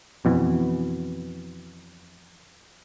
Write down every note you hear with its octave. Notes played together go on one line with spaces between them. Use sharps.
F2 B2 E3